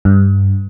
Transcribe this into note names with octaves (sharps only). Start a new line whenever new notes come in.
G2